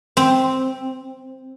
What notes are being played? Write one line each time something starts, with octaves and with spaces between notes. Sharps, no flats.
C4